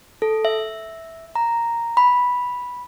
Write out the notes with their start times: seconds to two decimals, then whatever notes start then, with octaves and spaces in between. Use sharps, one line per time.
0.22 A4
0.45 E5
1.36 A#5
1.97 B5